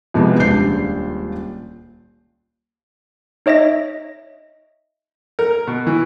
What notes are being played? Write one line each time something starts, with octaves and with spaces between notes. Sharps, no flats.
F2 C3 G#3 B3
D#1 C#2 D4 G6 C7
D#4 C#5 D#5 E5 A#6
A#4
B2
E3